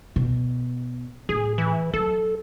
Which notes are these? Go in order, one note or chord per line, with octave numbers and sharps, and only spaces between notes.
B2
A2 G#4
E3
F#3 A4